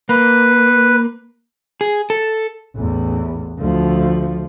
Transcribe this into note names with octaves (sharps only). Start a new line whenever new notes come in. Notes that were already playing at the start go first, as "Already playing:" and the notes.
A#3 B4
G#4
A4
A1 E2
D2 F3